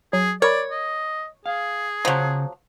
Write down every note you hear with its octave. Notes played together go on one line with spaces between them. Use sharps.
F#3 G#4
A#4 C#5 D5 B5
D#5
G#4 F5
C#3 F3 F#3 C5 A#5